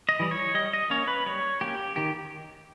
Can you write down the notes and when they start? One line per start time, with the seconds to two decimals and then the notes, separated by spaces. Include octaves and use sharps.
0.09 D#5
0.20 E3 G3
0.31 C#5
0.54 G3 D#5
0.73 D#5
0.90 A#3 C#4 C#5
1.08 B4
1.26 G3 C#5
1.61 A#3 C#4 G4
1.96 D#3 G4